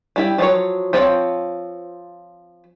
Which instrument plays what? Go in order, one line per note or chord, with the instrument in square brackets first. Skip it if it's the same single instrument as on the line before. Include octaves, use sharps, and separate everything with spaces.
[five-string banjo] G3 E4 G5
F3 F#3 C#5
F3 C4 F4 C#5 G5